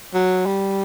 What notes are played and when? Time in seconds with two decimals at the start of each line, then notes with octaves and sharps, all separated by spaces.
0.14 F#3
0.46 G3